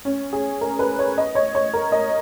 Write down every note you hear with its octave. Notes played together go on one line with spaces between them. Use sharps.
C#4
G#4
A#4
B4
C#5
D#5
C#5
C#5
A#4
D#5